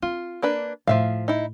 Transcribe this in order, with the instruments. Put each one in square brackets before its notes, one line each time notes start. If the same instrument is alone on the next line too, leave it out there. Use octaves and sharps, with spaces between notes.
[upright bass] C4 [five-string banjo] F4
[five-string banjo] A#3 D4 B4
[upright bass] A2 [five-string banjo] F3 E5 F5
[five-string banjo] D#4 E4